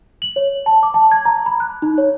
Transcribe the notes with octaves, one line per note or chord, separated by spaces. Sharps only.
F#7
C#5
A5
D6
A5
G#6
A#5
B5
F#6
D#4
C#5